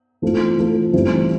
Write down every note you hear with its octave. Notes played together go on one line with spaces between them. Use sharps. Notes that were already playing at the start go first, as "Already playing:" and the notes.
E3 A3 C4 F4 A4
E3 A3 C4 F4 A4
A1 A2 G3 C4 E4